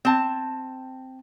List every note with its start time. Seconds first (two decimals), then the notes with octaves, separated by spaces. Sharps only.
0.05 C4 A5